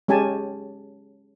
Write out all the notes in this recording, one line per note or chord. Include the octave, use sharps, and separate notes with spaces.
G#3 C#4 G4 G#5 A5